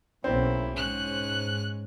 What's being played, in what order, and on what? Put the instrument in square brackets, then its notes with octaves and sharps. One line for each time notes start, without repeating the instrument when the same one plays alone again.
[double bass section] B1 A#3 C#4 [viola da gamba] E2 E4 [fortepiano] C4
[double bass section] G#2 [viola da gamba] C#4 [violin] F#6